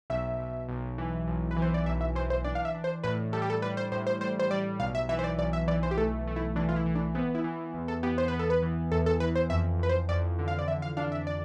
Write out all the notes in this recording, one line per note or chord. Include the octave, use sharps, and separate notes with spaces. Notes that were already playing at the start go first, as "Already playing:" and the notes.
B1 E5
B1
B1
E3
B1
B4
E3
C5
D5
B1 E5
E5
E3 C5
C5
D4 D5
F5
E5
D4
C5
A2 B4
G3 A4
G4
A4
G3 B4
C5
A2 C5
C5
G3 C5
C5
G3 D5
B1 F5
E5
E3 E5
C5
D5
B1 D5
E5
E3 D5
C5
G4
A3 A4
A3
E4
E3 D4
F4
E4
E3
D4
B3 C4
E4
E3
E2
A4
B3 G4
C5
B3 B4
A4
B4
E3
E2 A4
A4
E3 B4
C5
F2 E5
F2 B4
C5
F2 D5
D3
F5
D5
D3 E5
F5
D4 F5
E5
D5